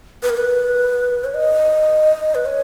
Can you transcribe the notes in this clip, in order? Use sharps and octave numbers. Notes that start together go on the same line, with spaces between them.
B4
A#4
B4
C#5
D#5
B4
C#5